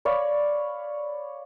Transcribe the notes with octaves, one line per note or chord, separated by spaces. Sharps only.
C#5 D5 F5 B5